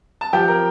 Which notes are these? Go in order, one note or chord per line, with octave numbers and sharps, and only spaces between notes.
A5
F3 G4 G5
A#4 A#5